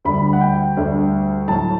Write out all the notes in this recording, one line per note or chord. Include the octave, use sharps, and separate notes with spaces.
D2 D3 G3 B5
F#5
G5
D2 D3 G3
A2 F#3 A5